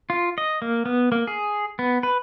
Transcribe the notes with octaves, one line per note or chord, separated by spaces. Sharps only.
F4
D#5
A#3
B3
A#3
G#4
B3
B4